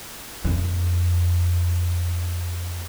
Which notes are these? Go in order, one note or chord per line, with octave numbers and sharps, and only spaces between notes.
F2 A#3